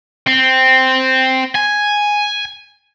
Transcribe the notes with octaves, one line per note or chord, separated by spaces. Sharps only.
C4
G#5